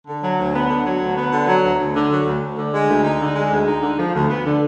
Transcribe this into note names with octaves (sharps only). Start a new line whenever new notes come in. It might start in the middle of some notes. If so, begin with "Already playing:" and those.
D3
F#3
D2
B3
D3
F#3
D2
B3
D3
F#3
D2
D2
D3
F#3
D2
D2
D3
G#3
D2
D#4
D3
G#3
D2
D#4
D3
F3
D2
B3
D3